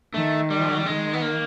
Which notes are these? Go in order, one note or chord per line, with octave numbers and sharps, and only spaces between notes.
D#3 A3
G3
F3
F#3
G3
D#3 G#3
B3
A#3